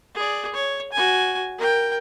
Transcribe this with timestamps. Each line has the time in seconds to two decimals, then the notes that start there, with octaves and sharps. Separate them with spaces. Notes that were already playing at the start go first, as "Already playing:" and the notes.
0.15 G#4 D5
0.53 C#5
0.92 F#4 G#5
1.58 A#4 G5